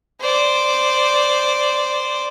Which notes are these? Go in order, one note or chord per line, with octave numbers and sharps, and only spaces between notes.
C5 D5